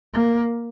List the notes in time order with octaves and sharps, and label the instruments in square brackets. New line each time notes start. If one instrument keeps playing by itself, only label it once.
[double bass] A#3